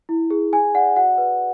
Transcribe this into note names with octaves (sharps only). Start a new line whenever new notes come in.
E4
G#4
G#4 G#5
D5 F#5
F#4 F#5
B4